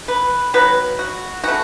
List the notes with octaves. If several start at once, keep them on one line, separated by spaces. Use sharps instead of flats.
B4
D#3 F#3 B3 B4
F#4
E3 A3 F#4